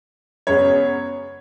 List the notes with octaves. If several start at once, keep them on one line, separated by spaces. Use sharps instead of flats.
F#2 C#3 G#3 B3 C#5